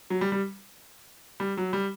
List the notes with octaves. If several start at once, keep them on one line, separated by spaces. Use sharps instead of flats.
F#3
G3
G3
G3
F#3
G3